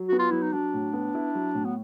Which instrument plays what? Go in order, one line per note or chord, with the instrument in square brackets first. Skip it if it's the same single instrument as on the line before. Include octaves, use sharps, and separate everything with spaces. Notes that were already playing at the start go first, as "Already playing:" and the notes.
Already playing: [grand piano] F#3
[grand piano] B3 [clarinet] F#4
[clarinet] F4
[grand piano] F#3 [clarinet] E4
[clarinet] D#4
[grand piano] F#3 [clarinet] D4
[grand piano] A2
B3
E4
F#3
A2
[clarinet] B3